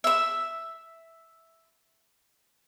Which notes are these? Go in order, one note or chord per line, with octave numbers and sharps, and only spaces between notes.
E5 E6